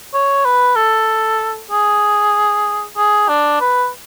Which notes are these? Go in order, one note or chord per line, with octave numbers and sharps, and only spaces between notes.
C#5
B4
A4
G#4
G#4
D4
B4